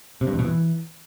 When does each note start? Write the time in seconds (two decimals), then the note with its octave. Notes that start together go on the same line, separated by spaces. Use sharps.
0.21 C3
0.27 G2
0.33 E2
0.39 B2
0.45 E3